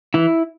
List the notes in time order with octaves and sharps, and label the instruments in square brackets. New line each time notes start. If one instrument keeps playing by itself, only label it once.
[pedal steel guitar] E3 E4